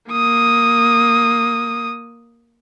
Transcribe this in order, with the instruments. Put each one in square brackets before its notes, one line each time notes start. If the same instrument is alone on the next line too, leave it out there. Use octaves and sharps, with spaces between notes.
[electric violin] A#3 D#6